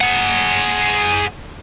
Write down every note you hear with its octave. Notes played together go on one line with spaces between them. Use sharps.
G#4 F#5